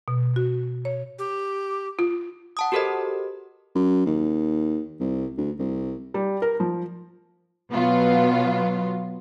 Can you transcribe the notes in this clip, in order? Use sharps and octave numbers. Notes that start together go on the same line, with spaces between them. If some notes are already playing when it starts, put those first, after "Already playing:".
B2
F#4
C#5
G4
F4
F#5 A5 D#6
F#4 G4 A4 A#4 C5 D#5
F#2
D#2
C2
D2
C2
G3
A#4
F3
B2 F#3 B3 F4